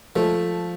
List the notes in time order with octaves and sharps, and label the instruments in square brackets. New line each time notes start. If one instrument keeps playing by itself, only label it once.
[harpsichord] F3 [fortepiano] A3